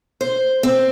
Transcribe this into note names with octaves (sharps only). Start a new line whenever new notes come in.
C5
C4